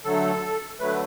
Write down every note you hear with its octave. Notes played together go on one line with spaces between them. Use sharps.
D3 F#3 A3 A4
D3 F#3 A3 B4